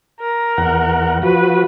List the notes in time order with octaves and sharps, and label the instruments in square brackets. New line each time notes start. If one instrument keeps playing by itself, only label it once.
[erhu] A#4
[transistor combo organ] E2 F#5
[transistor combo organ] F3 F#4 [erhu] B4